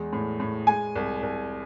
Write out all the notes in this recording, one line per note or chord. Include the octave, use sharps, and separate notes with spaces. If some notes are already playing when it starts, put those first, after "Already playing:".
Already playing: E2 G#3
A2
A2
G#3 G#5
C2
C2